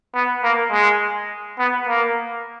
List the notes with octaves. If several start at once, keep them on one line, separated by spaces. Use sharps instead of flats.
B3
A#3
G#3
B3
A#3